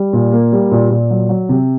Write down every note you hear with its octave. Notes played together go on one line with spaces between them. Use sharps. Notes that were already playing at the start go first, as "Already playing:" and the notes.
Already playing: G3
A#2
A#3
G3
A#2
A#2
F#3
F#3
C3